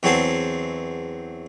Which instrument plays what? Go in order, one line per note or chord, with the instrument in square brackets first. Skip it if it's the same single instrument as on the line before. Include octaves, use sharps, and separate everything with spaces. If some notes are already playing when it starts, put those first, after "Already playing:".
[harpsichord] E2 F#3 C4 G#4 A5 C6